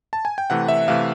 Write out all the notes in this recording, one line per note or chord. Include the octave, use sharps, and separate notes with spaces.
A5
G#5
G5
C3 E3 A3 F#5
E5
C3 E3 A3 F5